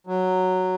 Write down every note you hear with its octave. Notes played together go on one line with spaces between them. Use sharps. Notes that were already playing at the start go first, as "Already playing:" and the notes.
F#3